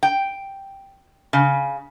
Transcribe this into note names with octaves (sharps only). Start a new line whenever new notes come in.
G5
C#3